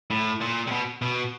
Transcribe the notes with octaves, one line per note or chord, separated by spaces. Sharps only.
A2
A#2
C3
B2
B2